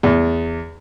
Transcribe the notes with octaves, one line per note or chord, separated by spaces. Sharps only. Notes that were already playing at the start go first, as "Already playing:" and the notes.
E2